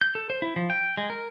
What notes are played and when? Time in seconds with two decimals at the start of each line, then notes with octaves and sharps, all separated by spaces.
0.01 G6
0.15 A4
0.30 C5
0.42 E4
0.56 F3
0.70 G5
0.97 G#3
1.10 A#4